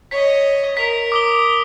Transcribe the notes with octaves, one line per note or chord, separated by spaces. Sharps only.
C#5 D#5 B6
A#4 B6 F7
D6 D#6 G7